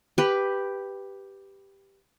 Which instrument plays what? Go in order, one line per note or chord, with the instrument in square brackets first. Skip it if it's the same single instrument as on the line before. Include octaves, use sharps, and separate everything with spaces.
[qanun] G4 B4